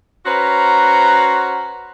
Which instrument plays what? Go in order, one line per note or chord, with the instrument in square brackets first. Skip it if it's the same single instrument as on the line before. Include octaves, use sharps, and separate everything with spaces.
[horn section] C#4 F#4 B4 C5 F#5 A#5